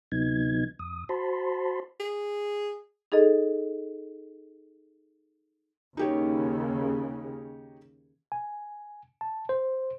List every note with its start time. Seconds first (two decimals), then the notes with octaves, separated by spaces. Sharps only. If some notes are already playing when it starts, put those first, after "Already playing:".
0.12 D2 C3 F#3 B3 D#4 G#6
0.79 F2 D#6
1.09 F#4 C5 A5 B5 C6
2.00 G#4
3.12 D#4 G#4 A4 D#5
5.97 D#2 C#3 D#4 G4 C#5
8.32 G#5
9.21 A5
9.49 C5